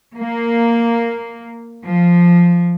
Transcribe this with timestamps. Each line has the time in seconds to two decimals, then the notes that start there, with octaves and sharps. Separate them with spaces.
0.16 A#3
1.84 F3